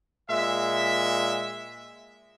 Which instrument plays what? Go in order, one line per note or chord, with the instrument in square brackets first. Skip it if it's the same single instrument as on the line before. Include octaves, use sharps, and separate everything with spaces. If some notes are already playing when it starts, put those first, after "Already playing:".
[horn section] A#2 G#3 E5